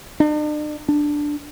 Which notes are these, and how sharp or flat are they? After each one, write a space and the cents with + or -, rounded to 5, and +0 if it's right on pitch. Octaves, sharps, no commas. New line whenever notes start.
D4 +45
D4 +5